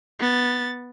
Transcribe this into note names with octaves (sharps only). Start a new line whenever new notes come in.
B3 A6